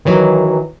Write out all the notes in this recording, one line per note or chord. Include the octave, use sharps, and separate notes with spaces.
D#3 E3 F#3